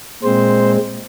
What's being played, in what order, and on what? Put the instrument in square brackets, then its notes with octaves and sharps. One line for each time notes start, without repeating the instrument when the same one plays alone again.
[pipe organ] A#2 G#3 C4 C5